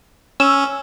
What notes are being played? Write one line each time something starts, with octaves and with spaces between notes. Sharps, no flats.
C#4 E6